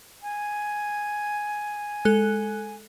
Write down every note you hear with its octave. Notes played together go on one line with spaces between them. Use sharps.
G#5
G#3 A4 F#6